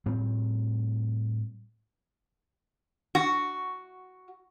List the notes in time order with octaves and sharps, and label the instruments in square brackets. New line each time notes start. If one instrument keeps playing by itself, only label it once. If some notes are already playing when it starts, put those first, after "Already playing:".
[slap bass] A2 G3 C4
[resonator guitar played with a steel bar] F#4